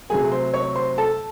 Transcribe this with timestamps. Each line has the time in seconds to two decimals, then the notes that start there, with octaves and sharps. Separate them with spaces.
0.10 C3 F#3 A3 G#4 G#5
0.32 C5 C6
0.54 C#5 C#6
0.75 C5 C6
0.98 A4 A5